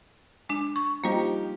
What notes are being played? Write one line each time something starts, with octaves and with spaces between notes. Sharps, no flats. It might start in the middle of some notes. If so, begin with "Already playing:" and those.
G#3 D4
C#6
F3 G3 A#3 D#4 G4